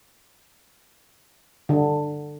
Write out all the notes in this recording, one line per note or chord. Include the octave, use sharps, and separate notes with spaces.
D3